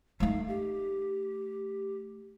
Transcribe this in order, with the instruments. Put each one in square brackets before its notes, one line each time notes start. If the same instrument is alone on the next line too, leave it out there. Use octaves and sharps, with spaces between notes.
[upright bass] A3 D#4 [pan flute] F5
[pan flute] G4